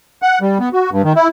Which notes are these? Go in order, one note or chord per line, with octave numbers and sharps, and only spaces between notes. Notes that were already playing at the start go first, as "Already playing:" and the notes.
F#5
G3
B3
F#4
G2
D#3
E4